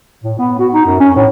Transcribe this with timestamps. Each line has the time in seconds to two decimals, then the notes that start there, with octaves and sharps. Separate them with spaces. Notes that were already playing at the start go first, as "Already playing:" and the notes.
0.24 A2
0.39 B3
0.59 F#4
0.73 D#4
0.86 F#2
1.00 C#4
1.16 A2